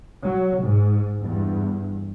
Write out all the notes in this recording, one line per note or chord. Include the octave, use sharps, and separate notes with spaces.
F#3
G#2
E2 G2